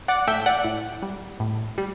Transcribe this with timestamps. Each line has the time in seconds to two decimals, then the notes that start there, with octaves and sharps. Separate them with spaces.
0.08 D5 F#5
0.27 A2 E5 G5
0.46 D5 F#5
0.64 A2
1.02 G3
1.40 A2
1.78 G3